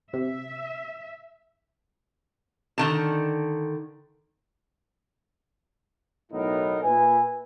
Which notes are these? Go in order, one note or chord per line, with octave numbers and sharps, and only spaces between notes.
C3 E5
D3 D#3 A5
B1 A2 B3 D#4 E4 A#4
A#2 B4 E5 G#5